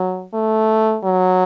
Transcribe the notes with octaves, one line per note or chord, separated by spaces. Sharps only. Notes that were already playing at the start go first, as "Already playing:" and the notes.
Already playing: F#3
A3
F#3